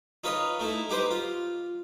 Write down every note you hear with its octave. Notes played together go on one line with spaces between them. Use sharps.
D#4 F4 B4 C#5 D#5
A3 D#4 E4
D#4 G4 B4 C5
F4